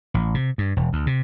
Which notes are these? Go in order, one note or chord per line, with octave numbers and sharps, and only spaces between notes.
A1
C3
G2
E1
D2
C3